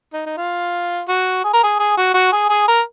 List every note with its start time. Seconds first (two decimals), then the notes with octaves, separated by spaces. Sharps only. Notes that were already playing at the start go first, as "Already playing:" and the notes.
0.13 D#4
0.26 D#4
0.37 F4
1.08 F#4
1.44 G#4
1.53 A#4
1.63 G#4
1.79 G#4
1.97 F#4
2.14 F#4
2.33 G#4
2.49 G#4
2.68 A#4